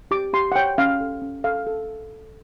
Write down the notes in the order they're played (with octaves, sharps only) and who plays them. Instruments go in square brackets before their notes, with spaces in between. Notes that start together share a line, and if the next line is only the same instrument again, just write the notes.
[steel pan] G4 D6
G4 C6
F#5
C#5 G5
C#4 F5
A4
C#4
A4 F5
A4